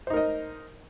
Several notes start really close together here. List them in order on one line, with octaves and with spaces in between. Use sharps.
C5 D#4 A#4 D#5